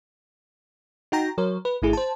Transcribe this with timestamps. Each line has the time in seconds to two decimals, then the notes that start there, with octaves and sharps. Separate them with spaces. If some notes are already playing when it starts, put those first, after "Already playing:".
1.12 D#4 F#4 G5 A#5 A#6
1.38 F#3 A#4 C#5
1.65 B4
1.82 G#1 A3 E4 G#4
1.93 C5 A5